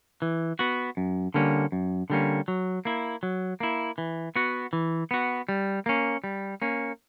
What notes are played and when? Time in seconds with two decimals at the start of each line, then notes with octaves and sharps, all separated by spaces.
0.22 E3
0.59 B3 F#4
0.97 F#2
1.34 D3 G3 A#3 C#4
1.72 F#2
2.10 D3 G3 A#3 C#4
2.48 F#3
2.85 A#3 E4
3.23 F#3
3.60 A#3 E4
3.98 E3
4.36 B3 F#4
4.73 E3
5.11 B3 F#4
5.49 G3
5.86 A#3 C#4
6.24 G3
6.62 A#3 C#4